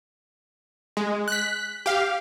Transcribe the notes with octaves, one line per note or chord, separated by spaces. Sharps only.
G#3
F#6 B6
G4 F5